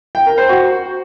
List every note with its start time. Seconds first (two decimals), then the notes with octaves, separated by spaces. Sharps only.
0.15 G5
0.26 A#4
0.38 C5
0.49 F#4